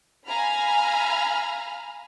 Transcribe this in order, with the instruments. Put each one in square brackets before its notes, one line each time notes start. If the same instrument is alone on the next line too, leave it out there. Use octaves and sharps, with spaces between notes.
[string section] F5 G#5 A#5 B5 F6